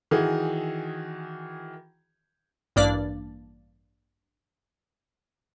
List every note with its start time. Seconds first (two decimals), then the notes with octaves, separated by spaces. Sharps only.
0.11 D#3 E3 F#4 G#4
2.76 A1 G2 A#3 D4 D5